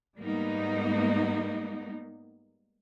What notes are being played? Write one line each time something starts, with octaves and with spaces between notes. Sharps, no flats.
G#2 G3 A#3 B3 D#4